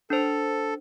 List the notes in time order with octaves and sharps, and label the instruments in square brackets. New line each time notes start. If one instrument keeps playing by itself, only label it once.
[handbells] D4 C5 [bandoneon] A4